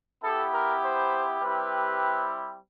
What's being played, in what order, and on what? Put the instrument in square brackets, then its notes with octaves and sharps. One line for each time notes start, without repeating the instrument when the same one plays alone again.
[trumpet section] B3 E4 G4 A4
A#4
C5
G3 C4 E4 G4 B4